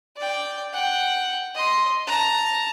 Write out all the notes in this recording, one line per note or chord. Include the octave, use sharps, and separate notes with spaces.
D5 G5
F#5 G5
D#5 C6
A5 A#5